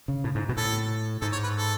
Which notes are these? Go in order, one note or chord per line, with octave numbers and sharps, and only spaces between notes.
C#3
A2
G#2
B2
A2 A4
G#2 A4
C#5
B4
A4